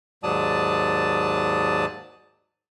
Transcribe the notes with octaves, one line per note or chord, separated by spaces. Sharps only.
D#2 G#2 F#3 D5 A5 D#6